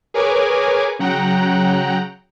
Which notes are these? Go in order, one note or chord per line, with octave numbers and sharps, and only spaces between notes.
G#4 A#4 B4 C#5 G#5 D6
C#3 F#3 F#5 G5 A#5 F#6